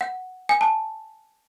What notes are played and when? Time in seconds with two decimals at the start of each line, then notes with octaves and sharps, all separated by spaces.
0.01 F#5
0.49 G#5
0.61 A5